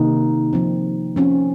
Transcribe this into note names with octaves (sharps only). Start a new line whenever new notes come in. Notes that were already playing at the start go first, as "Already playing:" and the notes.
Already playing: C3 D#3 A#3 D#4
F3 C4
F3 C4 C#4